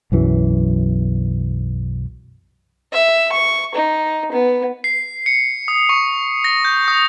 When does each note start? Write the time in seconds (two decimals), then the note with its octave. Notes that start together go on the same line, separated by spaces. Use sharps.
0.12 B1 F#2 E3 F#3
2.92 E5
3.32 C#6
3.75 D#4
4.32 B3
4.84 C7
5.26 C#7
5.68 D#6
5.89 C#6
6.44 A#6
6.65 G6
6.88 D#6